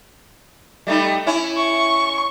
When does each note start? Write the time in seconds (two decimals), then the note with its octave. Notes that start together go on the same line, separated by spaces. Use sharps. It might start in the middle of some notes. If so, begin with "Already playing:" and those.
0.87 G3 A3 D#4
1.27 C#4 E4
1.57 C#6